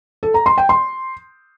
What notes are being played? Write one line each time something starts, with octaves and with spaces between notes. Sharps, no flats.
A4
A#5
C6
G5
C6